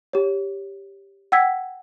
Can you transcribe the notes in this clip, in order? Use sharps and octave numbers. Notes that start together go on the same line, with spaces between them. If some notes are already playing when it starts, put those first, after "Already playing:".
G4 C#5
F#5 G5 E6 G#6 B6